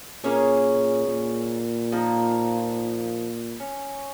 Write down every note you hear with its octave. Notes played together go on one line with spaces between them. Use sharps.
A#2 A#3 C#4 G#4 C#5
A#2
F3 A#3 D#4
C#4